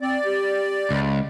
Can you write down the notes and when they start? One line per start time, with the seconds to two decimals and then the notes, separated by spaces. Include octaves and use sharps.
0.01 C4 D5
0.25 G4
0.91 C#2